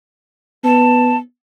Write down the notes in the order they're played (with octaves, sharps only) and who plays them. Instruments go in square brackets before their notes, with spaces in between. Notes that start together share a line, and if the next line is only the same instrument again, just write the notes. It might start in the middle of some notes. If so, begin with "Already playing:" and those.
[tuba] B3 [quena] A5